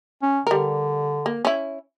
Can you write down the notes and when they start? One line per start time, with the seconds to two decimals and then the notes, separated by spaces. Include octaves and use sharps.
0.22 C#4
0.47 D3 G3 A#4
1.26 A#3
1.45 C#4 E4